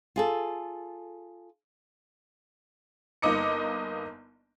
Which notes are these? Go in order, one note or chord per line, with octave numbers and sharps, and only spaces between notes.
F4 G#4 A4
G1 A#3 D#4 D#5 D6 C#7